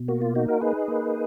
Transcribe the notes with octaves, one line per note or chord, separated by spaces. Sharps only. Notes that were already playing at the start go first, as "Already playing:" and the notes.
Already playing: B2
A#3 F#4
F4
D#4 F#4
F#4 A#4
D#4 G#4 B4
A#3